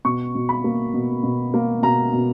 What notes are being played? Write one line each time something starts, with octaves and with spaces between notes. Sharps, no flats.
B2 C#6
B2
B5
A#3
B2
B2
A#3
B2 A#5
B2